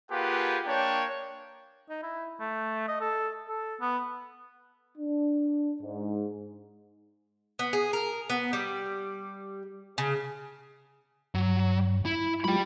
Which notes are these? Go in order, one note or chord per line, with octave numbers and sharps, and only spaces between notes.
A#3 F4 G4 G#4 B4 F#5
A#3 D4 C#5 G5
D#4
E4
A3
D#5
A4
A4
B3
D4
G#2
B3
G#4
A#4
B3
G3
C#3
G2 F#3
E4
F#3 G#3 F4 G4 B5